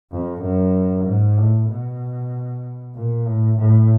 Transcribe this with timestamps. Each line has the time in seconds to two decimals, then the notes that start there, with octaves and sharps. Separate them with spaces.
0.12 F2
0.42 F#2
1.06 G#2
1.37 A2
1.69 B2
2.95 A#2
3.26 A2
3.58 A2